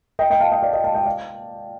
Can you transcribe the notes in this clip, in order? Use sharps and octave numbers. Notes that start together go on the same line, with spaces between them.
D#5 G5
D#5 G5
F5 A5
D#5 G5
D5 F5
D#5 G5
F5 A5
D#5 G5
D5 F5